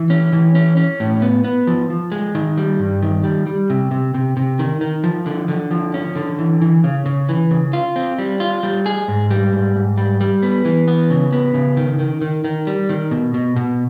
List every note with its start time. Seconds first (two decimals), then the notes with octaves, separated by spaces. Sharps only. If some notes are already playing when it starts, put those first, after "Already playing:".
Already playing: E3
0.10 C#4
0.33 E3
0.55 C#4
0.77 C#4
1.00 A2
1.22 B3
1.44 B3
1.67 F3
1.90 F3
2.12 G#3
2.35 D#3
2.58 G3
2.79 G2
3.03 D#3
3.24 G3
3.47 G3
3.70 C3
3.91 C3
4.14 C3
4.37 C3
4.59 D#3
4.81 D#3
5.04 F3
5.26 D3
5.48 D3
5.71 F3
5.94 C#4
6.16 D3
6.39 E3
6.62 E3
6.84 C#3
7.06 C#3
7.29 E3
7.51 C#3
7.73 F4
7.96 C4
8.19 G3
8.40 F4
8.63 G3
8.86 G#4
9.08 G#2
9.30 G3
9.53 G#2
9.76 G#2
9.98 G3
10.21 G3
10.43 B3
10.65 E3
10.88 B3
11.10 C#3
11.33 B3
11.54 C#3
11.77 D#3
11.99 D#3
12.21 D#3
12.44 D#3
12.67 G3
12.89 D#3
13.11 B2
13.34 B2
13.56 B2